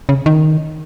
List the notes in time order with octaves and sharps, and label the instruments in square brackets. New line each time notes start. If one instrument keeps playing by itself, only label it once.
[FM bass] C#3
D#3